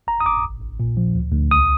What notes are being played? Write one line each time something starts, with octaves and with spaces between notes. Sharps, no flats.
G1 A#5
D#6
G1 D6
A#1
A#1
A#2
F3
D2
D2
C2 D#6